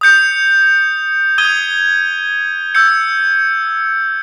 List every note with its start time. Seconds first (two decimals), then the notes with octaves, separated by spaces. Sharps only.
0.01 D#6 G6 C#7
1.38 D#6 G#6 D#7 G7
2.75 E6 G6 C#7